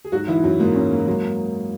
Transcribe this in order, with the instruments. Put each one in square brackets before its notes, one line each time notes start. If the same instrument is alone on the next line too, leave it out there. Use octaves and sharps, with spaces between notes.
[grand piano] G#4
[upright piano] G#2 [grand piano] F#3 F#4
[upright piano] G#2 [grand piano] E3 E4
[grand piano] F#2 F#3 [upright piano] C#4
[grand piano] G#2 G#3 [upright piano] A#3
[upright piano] C#4
A#3
[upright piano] F#3 [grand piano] G#3